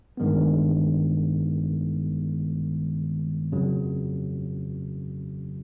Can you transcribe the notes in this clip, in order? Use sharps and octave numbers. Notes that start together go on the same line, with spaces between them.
A1 G2 D#3 G#3 B3
F2 C#3 F#3